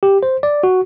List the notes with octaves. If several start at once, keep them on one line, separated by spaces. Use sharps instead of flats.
G4
C5
D5
F#4